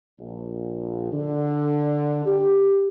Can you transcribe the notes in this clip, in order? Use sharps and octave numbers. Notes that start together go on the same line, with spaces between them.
A#1
D3
G4